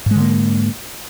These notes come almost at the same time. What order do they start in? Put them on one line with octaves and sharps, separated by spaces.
G#2 G#3 D3 A#3